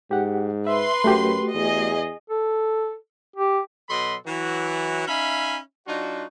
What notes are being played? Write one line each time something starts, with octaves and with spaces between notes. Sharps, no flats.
G#2 G4 F#5
B4 E5 C6
F#2 A3 F#4 G4
E2 G#4 D#5
A4
G4
B2 F#3 A4 D#5 B5 C6
E3 F#3 F#4
C#4 D#4 E5 F5 G#5 B5
F#3 D4 D#4 F4 F#4